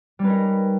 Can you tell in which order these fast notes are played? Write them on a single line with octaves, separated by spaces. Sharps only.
G3 C#4 B4 A#4 D#4